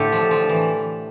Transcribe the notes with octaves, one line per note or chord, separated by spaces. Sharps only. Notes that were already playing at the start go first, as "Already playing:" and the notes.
Already playing: A2 D3 A3 G4 A4
F3
F3
E3